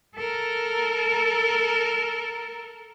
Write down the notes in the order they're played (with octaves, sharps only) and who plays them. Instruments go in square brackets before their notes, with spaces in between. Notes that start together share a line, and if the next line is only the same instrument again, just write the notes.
[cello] A4 A#4